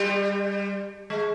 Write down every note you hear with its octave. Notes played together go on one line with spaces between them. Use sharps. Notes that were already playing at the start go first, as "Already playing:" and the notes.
Already playing: G3
G#3